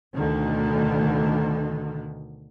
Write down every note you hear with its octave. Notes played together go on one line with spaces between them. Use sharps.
D2 B2 D3 D#3